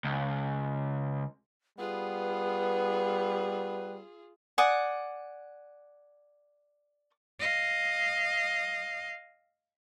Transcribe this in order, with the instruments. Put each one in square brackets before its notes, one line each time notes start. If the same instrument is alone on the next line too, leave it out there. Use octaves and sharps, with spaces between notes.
[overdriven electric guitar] C#2
[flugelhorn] G3 [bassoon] B3 [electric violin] F4 G#4 [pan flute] B4
[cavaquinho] D5 F#5 G#5 D#6
[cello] D#5 F5